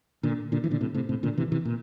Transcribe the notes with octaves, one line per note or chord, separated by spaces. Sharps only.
A#2 D3
A#2 D3
E3
A#2 D3
A2 C3
A2 C3
A2 C3
A#2 D3
C3 E3
C3 E3
A#2